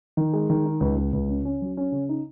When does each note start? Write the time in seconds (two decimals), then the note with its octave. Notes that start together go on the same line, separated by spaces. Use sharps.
0.17 D#3
0.33 G#3
0.50 D#3
0.65 D#4
0.80 C#2
0.96 C#2
1.13 C#2
1.29 C#3
1.45 C#4
1.61 F#3
1.77 C#4
1.92 C#3
2.09 D#4